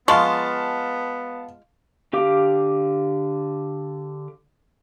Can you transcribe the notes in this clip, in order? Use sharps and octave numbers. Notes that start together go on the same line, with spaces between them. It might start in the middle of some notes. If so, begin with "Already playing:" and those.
G#3 B3 F4 F5 A5 C#6
D3 G4 F5 D6